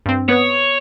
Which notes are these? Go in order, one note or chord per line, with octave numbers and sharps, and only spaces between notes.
G2 C4
B3 B4 C#5 D#6